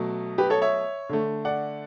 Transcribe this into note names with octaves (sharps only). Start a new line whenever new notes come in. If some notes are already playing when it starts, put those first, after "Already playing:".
Already playing: B2 F#3 A3
G4 B4
A4 C#5
C#5 E5
D3 A3
D5 F#5